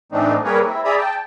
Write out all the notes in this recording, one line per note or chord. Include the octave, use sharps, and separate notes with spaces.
A2 E3 A3 C4 D4 D#4
G3 A#3 G#4 A#4 B4 C#5
C4 E4
G#4 D5 E5 A#5 B5 D#6
G5 A5